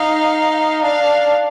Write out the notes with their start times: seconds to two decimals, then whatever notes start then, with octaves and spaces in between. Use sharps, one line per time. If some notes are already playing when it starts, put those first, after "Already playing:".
Already playing: D#4 F5
0.83 D4 F5